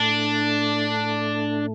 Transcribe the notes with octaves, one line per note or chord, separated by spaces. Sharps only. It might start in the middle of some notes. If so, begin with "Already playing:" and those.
Already playing: A2 A3 D4